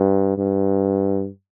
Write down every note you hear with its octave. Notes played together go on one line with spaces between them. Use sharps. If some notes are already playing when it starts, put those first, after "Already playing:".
Already playing: G2
G2